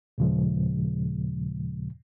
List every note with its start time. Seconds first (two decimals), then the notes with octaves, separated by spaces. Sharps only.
0.18 D#2 A#2 C#3 F3 G#3